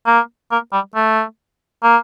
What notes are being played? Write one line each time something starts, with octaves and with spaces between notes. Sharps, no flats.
A#3
A#3
G3
A3
A#3